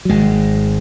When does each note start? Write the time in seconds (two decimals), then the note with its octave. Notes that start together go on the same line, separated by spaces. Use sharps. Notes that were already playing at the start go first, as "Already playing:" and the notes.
0.05 F#3
0.09 G#1 G#2 G#3